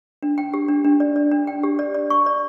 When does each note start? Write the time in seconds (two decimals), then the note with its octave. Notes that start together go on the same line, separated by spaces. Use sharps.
0.23 D4
0.38 G5
0.54 G4
0.68 D4
0.84 D4
1.00 D5
1.16 D5
1.31 D4
1.47 G5
1.63 G4
1.79 D5
1.95 D5
2.10 C#6
2.26 D5